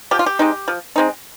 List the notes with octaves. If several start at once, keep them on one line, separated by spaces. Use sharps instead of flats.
F3 G4
F4
G4
G#3 C4 D#4
F3
G#3 C4 D#4